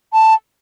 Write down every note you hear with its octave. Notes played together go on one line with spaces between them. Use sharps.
A5